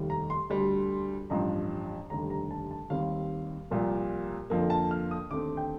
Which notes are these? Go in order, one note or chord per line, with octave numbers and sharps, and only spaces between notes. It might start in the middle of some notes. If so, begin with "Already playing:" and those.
Already playing: F1 D#2 D#3 G3
A#5
C6
D2 D3 G3
A1 G2 F3 A#5
F1 D#2 D3 G3 A#5
A#5
A5
A5
D#2 D#3 G3 C4 F5
C2 A#2 F3 A#3
F2 D3 F3 A#3
A5
F6
D#6
D#2 D3 A3 C4 D6
G5